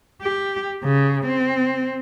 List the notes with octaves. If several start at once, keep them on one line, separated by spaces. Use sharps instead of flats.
G4
C#3
C4